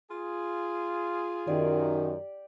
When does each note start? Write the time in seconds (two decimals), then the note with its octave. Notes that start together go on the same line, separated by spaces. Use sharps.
0.11 F4 G#4
1.47 F#2 D#3 G4 D5